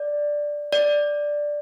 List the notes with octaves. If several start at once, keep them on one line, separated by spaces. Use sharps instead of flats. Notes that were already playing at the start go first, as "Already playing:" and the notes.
Already playing: D5
D5